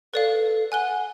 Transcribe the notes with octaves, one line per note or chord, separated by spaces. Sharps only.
A4 B4 D5 F5
F#5 G#5 F#6 G7